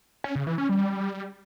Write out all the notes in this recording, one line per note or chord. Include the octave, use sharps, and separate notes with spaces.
C#4
C#3
E3
C#4
G3